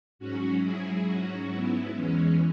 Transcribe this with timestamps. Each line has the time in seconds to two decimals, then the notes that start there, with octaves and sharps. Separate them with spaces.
0.19 G#2 F#3 C#4 F#4
0.63 E4 G#4
1.06 G#2 F#3 C#4 F#4
1.50 B3 E4
1.94 E2 E3 G#3 C#4